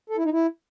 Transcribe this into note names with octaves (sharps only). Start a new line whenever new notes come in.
A4
E4
D#4
E4